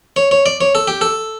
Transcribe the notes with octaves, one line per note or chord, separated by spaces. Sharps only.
C#5
C#5
D5
C#5
A4
G4
A4